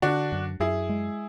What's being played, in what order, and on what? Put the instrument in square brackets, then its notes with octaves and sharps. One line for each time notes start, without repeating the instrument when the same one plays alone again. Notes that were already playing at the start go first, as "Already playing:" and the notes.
[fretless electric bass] D3 [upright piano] D4 F#4
[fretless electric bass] F#2
[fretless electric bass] F#2 [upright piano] E4 G#4
[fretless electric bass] G#3